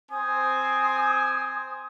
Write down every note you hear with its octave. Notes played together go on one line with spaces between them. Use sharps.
C4 C5 G#5 D#6